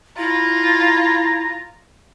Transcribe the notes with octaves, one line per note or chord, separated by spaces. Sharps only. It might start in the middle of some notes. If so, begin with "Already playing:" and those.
E4 F4 A#5